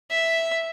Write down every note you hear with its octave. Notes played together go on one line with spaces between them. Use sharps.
E5